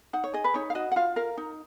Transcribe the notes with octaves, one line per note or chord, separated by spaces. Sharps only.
D#4 F#5
C#5
G#4 D#5
B4
D#4 C#5
F5
F#4 D#5
F#5
F4 F5
A#4 F5
D#4